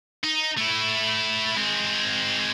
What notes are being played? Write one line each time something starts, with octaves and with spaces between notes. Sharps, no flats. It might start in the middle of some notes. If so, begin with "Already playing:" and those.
D#4
A3 E4
G#3 C4